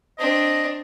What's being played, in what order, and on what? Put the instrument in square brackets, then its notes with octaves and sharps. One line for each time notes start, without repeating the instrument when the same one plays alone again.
[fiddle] C4 D4 [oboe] D#5